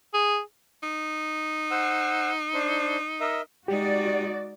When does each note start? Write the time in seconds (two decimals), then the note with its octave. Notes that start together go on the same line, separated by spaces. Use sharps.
0.14 G#4
0.83 D#4
1.71 C5 F#5 E6
2.54 D4 C5
3.20 A#4 D#5 E5
3.68 G#3 D#4 F#4 G4 D5